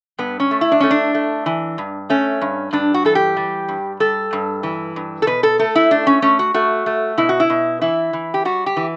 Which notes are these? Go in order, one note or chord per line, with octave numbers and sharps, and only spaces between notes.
G2 B3
C#4
A3
E4
D4
A3 C#4
D4
A3
E3
G2
A3 C#4
G2
G2 D4
F#4
E3 A4
G4
G3
G2
G3 A4
G2
E3
G2
A4
B2 B4
A4
A3 A4
E4
A3 D4
C#4
A3 C#4
F#4
A3 F#4
A3
B2 E4
F#4
E4
B2
E3 E4
E3
G4
G3 F#4
G4
E3